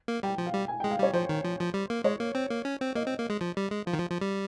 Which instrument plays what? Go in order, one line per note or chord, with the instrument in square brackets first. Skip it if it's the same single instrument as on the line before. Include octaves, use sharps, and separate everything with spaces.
[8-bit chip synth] A#3
[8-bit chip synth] G3 [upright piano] G5
[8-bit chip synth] F3
[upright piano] F5
[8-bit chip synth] G3
[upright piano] G#5
[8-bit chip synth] G#3 [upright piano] G5
[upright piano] F5
[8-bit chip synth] G3 [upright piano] C#5
[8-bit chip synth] F3 [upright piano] C5
[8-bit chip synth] D#3
F3
F3
G3
A#3
[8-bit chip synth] G#3 [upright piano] C#5
[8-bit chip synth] A#3
C4
A#3
C#4
C4
[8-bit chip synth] A#3 [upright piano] D#5
[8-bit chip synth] C4
A#3
G#3
F3
G3
G#3
[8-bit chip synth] F3 [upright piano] F5
[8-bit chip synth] D#3
F3
F3
G3